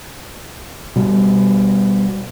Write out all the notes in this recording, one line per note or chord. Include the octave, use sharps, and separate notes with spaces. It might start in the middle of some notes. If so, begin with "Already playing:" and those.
B2 G3